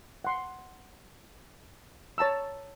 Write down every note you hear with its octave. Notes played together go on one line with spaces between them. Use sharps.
F#5 C6
C#5 A5 A#5 E6